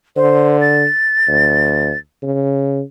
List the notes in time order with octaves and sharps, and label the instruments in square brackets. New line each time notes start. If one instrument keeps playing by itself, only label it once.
[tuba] D3 [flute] C5
[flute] A6
[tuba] D2
C#3